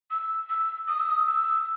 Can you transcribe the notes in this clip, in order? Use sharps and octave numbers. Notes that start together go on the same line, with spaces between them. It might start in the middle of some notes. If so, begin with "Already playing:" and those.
E6
E6
D#6
E6
D#6
E6